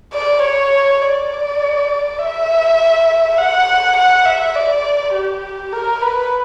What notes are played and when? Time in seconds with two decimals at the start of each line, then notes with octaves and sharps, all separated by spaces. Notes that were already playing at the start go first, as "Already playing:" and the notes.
0.14 D5
0.42 C#5
1.02 D5
2.19 E5
3.38 F#5
3.97 F#5
4.25 E5
4.55 D5
5.14 G4
5.73 A#4
6.02 B4